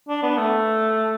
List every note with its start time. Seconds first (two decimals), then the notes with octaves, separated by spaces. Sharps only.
0.09 D4
0.23 B3
0.38 A3